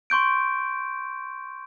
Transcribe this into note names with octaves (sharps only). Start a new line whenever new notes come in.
C6 C#6 G6 D7